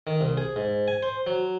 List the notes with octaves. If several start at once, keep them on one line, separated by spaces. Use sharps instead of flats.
D#3
C2
G#4
G#2
G#5
C5
F#3